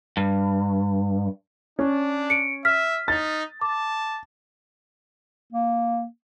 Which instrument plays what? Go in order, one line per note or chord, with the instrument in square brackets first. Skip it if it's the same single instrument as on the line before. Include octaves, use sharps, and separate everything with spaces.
[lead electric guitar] G2
[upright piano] C#4 [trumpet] D4
[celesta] C#7 D7
[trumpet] E5 [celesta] F6 B6
[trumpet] D#4 [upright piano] A6
[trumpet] A5 [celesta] D6
[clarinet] A#3